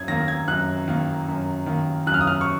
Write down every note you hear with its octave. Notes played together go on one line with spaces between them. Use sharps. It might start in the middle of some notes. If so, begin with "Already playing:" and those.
Already playing: F#2 G#6
D#3 A#3 A#6
G#6
F#2 F#6
D#3 A#3
F#2
D#3 A#3
F#2 F#6
F6
D#6
F6
C#6